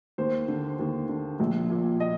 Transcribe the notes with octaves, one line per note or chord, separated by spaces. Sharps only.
D#2 C5
D3
D#2
D3
A#1
A#2
D#5